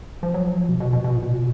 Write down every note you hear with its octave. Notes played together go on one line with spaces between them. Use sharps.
F3
F#3
F3
B2
B2
B2
B2
A#2
B2